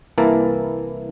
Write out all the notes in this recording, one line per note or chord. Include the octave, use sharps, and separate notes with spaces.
C2 E3 A#3 E4 A#4 A5